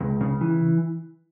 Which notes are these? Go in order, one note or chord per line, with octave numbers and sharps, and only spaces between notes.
C#2
C#3
E3